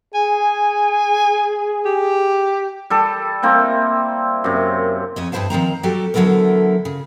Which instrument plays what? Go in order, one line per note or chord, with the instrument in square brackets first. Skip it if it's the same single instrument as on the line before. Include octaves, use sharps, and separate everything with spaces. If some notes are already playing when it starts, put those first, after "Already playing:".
[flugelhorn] G#4 [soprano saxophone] G#5
[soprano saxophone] G4
[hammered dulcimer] G3 A4
G3 A#3 C4 E4
F#2 C3
[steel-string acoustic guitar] F2 C#5 D#5
G2 D#4 E4 C5 F5 A5
D#3 F3 C4 A#5
F#3 G3 F#4 G4 A4
E2 D3 F#3 E4 A4 A#4
C#3